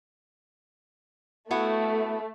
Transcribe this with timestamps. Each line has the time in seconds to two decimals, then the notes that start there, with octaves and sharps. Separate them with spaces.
1.51 A3 B3 E4 F#4